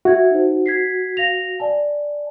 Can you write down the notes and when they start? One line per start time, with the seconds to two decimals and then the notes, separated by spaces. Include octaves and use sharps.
0.05 F#4 E5 G#6
0.31 D#4 C5
0.66 G#6 B6 C7
1.17 F5 A#6 F7
1.60 D5 G#5 A5